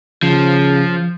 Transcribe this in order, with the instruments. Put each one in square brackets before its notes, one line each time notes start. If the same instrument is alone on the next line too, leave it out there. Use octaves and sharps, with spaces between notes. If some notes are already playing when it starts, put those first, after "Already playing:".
[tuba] C#3 [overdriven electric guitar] F3